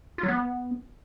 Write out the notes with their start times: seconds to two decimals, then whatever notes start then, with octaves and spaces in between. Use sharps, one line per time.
0.18 F4
0.23 F#3
0.28 B3